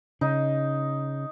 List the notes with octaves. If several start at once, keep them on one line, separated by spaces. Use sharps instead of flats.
C#3 D#4